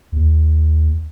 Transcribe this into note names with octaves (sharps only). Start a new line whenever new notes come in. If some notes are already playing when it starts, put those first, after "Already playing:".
D#2